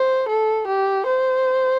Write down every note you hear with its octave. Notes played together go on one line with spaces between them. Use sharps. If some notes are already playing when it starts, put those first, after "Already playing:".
Already playing: C5
A4
G4
C5